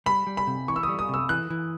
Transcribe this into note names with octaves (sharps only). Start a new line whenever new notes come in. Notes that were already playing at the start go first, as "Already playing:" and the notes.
G3 B5
G3
B5
C3
E3 C#6
E6
D#6
G3
D#6
C3 E6
E3 F#6
E3